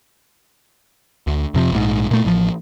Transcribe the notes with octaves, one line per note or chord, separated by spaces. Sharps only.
D2
F2 C3 F3
A#1 G#2
A#2 A3
A1 F3